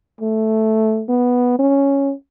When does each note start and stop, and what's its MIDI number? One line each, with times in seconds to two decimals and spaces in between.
0.21 1.03 57
1.09 1.58 59
1.59 2.13 61